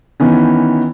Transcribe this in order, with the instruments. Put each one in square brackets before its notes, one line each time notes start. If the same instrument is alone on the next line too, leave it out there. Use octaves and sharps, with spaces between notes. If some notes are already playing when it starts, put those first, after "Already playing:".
[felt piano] D#3 E3 B3 C#4